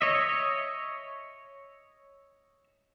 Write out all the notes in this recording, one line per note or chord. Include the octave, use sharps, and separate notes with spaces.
C#5 D#5 E5